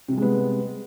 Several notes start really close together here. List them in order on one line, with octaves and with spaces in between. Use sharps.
C3 G3 G#3 B3